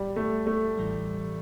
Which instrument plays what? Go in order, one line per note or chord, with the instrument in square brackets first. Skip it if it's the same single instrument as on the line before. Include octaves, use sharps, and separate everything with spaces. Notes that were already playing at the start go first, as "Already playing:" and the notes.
Already playing: [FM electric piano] A#1 A2 [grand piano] G3
[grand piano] A3
A3
[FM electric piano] A1 A2 E3 G3